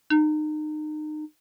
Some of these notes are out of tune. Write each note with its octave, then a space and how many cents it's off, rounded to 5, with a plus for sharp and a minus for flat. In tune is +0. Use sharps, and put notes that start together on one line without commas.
D#4 -30